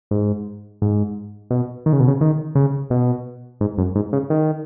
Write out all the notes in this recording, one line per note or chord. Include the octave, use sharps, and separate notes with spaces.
G#2
G#2
B2
D#3
C#3
B2
C#3
D#3
C#3
B2
G#2
F#2
G#2
C#3
D#3